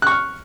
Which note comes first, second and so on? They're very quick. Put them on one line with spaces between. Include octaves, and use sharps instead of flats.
F#6 C#6 F6